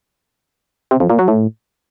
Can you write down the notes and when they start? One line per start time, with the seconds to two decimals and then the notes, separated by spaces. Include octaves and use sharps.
0.91 C3
1.00 F2
1.10 A#2
1.19 F#3
1.28 A2